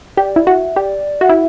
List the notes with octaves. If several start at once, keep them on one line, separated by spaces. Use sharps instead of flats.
G4 D5
E4
F#4 E5
G4 D5
F#4 E5
E4